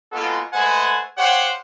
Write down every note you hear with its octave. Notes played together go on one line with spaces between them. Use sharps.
G#3 A#3 B3 F4 F#4 A4
G#3 A3 B4 C5 F#5 G#5
G4 C5 C#5 F5 F#5